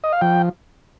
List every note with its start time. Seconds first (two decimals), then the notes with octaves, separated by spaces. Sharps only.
0.04 D#5
0.13 F5
0.21 F3 G5